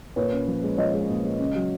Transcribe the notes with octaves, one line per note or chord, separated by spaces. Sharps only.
A#2 B4 C#5
C#4
F3
G#3
F3 C#5 D#5
G#3
A#2
G#3
C#3
F#3